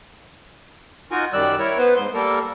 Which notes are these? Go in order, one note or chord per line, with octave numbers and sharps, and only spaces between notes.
D#4 F4 F#4 A#4 G#5
F#2 D#3 G3 D5 E6 F#6
E4 A#4 C#5
B3 B4 C5
G#2 C6
G3 A#3 A4 A#4